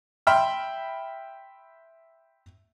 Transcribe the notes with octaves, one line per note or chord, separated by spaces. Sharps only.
E5 G5 B5 C6 F6